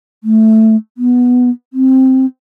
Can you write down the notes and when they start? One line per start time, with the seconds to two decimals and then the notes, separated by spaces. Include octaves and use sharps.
0.24 A3
0.98 B3
1.73 C4